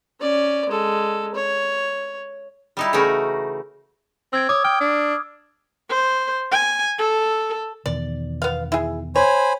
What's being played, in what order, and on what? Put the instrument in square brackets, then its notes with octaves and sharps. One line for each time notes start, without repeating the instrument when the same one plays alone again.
[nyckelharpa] C#4 D5
G#3 A4
C#5
[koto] G3 D#4 E4
C#3 E3 A3 D#4 F#4 A#4
[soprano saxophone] C4 [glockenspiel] E6 G#6 D7
[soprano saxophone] C#5 [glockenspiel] D6 D#6
[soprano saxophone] G5 [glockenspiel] F6
[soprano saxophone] D4
[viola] C5
G#5
A4
[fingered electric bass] E2 B2 D#3 [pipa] D5
[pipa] B3 F5
E4 G#4
[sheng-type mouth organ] C5 G#5 B5 [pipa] C#5